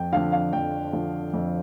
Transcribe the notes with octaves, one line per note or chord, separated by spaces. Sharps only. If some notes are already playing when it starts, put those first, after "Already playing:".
Already playing: F2 G5
D3 F3 F5
F5
F2 G5
D3 F3
F2